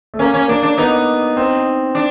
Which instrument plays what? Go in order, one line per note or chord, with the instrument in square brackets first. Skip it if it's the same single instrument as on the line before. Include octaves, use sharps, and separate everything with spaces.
[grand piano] A3
[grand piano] A#3 [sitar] C#4
[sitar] C#4
[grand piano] A#3 [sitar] D4
[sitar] D4
[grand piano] B3 [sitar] D#4
[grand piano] C4
[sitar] D4